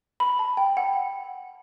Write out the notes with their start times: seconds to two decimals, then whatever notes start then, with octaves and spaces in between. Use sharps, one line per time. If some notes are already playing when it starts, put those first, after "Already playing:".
0.20 B5
0.39 A5
0.57 G5
0.77 F#5